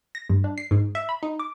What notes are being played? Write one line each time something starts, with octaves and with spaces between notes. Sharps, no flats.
A#6
G2
D4
C7
G#2
E5
B5
D#4
D6